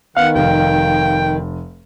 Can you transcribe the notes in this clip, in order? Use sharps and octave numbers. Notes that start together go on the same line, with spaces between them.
D#3 B3 F5 F#5
F1 G5